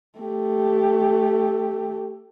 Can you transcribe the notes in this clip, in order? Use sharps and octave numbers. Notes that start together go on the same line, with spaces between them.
A3 G4